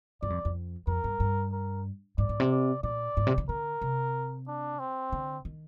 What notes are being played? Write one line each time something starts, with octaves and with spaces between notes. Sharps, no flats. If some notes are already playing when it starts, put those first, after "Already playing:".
G2 D5
F2
F2
F2 A#4
G2
G2
A#4
G#2 D5
G#2
C3
D5
A#2 D5
G#2
C3
D3
D3 A#4
C3
D4
C4
D3
D#3